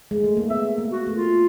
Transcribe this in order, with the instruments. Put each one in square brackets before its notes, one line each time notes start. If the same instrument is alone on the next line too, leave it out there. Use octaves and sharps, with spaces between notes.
[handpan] G#3
A3
A#3
[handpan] B3 [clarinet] E5
[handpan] A#3
[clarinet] F#4
[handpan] A3
[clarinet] F4